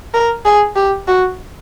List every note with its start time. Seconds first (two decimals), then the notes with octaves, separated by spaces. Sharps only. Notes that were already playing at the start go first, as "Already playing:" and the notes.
0.14 A#4
0.45 G#4
0.76 G4
1.07 F#4